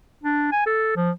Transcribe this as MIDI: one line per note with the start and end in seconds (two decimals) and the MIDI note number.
0.24 0.48 62
0.52 0.66 80
0.66 0.94 69
0.96 1.10 53